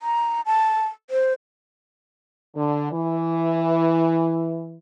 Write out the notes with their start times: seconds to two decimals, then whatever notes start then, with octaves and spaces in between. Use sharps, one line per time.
0.01 A#5
0.46 A5
1.10 C5
2.56 D3
2.92 E3